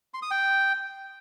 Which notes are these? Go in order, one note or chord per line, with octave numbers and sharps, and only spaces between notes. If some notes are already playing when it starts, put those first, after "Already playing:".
C6
D#6
G5